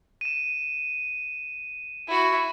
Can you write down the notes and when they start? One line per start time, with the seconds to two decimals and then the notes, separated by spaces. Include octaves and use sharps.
0.21 D#7 E7
2.08 E4 F#4